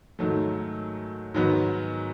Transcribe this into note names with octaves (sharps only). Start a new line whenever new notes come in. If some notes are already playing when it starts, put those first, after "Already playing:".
G#2 D#3 F#3 A3
G#2 D#3 F#3 B3